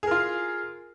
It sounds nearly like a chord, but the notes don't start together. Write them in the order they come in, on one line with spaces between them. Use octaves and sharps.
G#4 A#4 F4